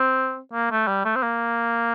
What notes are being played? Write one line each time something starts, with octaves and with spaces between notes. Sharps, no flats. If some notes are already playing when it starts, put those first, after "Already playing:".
Already playing: C4
A#3
A3
G3
A3
C4
A#3